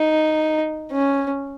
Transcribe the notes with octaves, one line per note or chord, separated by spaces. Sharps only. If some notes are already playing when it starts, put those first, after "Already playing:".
Already playing: D#4
C#4